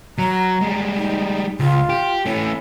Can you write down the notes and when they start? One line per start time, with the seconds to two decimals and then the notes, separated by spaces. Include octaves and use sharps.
0.18 F#3 A#5
0.61 G3 G#3
0.97 D#4
1.60 C#2 F4
1.89 G4
2.26 A3 C#4 E4